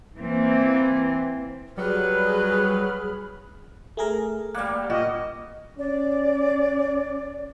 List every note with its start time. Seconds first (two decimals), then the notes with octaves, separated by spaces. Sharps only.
0.17 E3 A#3 C4
1.78 F#3 G3 G#4 B4 B5 F6
3.97 A3 G#4 A#4
4.55 G3 A#3 D5 F#5
4.90 A#2 F#4 D#5
5.79 C#4 D5